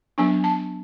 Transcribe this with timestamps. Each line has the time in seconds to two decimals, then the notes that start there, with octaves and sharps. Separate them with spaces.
0.18 F#3 B3 D4 G#5
0.44 A5